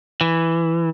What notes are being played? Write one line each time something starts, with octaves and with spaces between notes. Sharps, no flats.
E3